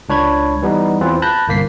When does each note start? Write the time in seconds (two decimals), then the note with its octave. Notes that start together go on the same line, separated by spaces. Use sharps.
0.09 C#2 D4 C#5 B5 G#6
0.62 E3 G3 B3 D#4
1.01 E2 E3 C4 F4 B4
1.22 A5 B5 F#6 G6 A#6
1.47 G1 C2 A#3 B6 C7